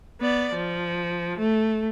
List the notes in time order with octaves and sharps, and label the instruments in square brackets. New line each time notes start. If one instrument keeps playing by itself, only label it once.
[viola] B3 D5
F3
A3